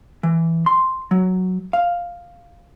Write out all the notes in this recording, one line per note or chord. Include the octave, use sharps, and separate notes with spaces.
E3
C6
F#3
F5